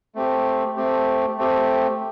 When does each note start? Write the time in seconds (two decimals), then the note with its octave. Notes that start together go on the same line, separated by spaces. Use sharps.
0.15 A3 C4 G4
0.76 A3 C4 G4
1.38 A3 C4 G4